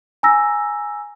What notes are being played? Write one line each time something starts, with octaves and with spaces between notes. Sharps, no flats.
G#5 A#5 E6 A#6